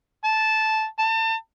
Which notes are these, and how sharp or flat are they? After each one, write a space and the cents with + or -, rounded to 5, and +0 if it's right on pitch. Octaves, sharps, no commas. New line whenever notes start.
A5 -10
A5 +30